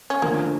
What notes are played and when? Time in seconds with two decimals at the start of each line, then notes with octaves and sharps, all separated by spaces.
0.10 C#4
0.22 D3 F3 A3 A#3